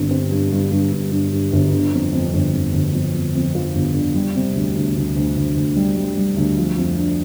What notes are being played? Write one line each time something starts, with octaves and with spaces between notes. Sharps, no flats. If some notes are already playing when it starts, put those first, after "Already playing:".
Already playing: G1 G2 C4
C4
G2
G2
G2
G2
G2
G2
G1
D3
F2
F2
G1
F2
G1
F2
F2
F2
F3
G1
D3
G3
C3
D2
D2
D2
D2
D2
D2
G3
G3
G3
D2
F3
F2
D4